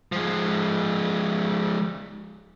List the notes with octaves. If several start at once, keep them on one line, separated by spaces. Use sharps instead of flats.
F3 G#3